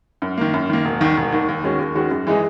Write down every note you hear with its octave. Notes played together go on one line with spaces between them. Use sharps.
F#2
D#3 A#3
F#2
D#3 A#3
E1
D#2 D#3
E1
D#2 D#3
D#2
D#3 G#3 C#4 F#4
D#2
D#3 G#3 C#4 F#4
F#2
E3 G#3 D#4 G#4